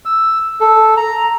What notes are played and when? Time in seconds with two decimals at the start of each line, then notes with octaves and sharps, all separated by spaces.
0.05 E6
0.61 A4
0.97 A#5